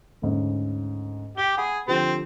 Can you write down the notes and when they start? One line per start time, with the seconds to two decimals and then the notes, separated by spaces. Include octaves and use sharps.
0.22 D2 G#2 C#3
1.37 G4 G7
1.58 G#4 F#5 B5
1.88 D3 F3 C4 G4